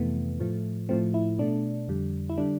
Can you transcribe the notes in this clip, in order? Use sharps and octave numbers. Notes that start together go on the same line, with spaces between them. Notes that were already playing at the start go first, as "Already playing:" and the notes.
Already playing: F2 C3 E3 A3 B3
A2 F3 A3
A2 F3 A3 C4
E4
B2 A3 D4
F2 D3 G3
E4
D3 G3 D4